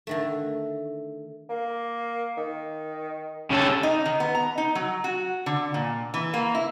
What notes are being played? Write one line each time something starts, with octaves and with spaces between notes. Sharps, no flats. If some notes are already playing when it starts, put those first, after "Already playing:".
D3 D#3 A3
A#3
D#3
C#3 G4 A4
D#4
D#3
B3
A#5
D#4
F#3
F#4
D3
A#2
E3
A#3
E4